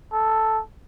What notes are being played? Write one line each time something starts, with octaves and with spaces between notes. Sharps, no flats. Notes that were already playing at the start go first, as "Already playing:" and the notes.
A4